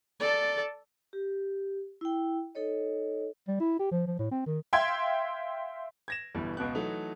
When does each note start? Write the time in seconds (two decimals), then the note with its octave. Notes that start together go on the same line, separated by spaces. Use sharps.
0.20 A4 D5
1.13 G4
2.01 E4 G5
2.55 D#4 A4 C#5 D#5
3.48 G3
3.60 E4
3.79 G4
3.91 F3
4.07 F3
4.19 A2
4.31 C4
4.46 D#3
4.73 E5 F5 G5 C6 G#6
6.08 G#6 A#6 E7
6.35 G1 B2 E3 G3
6.57 C#2 B2 B3 F#6
6.75 E3 F#3 A3 D#4